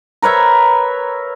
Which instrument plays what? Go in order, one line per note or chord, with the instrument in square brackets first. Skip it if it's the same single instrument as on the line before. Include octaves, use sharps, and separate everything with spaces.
[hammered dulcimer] A#4 B4 C#5 E5